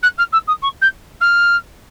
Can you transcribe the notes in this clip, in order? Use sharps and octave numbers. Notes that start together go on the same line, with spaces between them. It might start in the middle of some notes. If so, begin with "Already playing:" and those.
F#6
F6
E6
D#6
C#6
G6
F6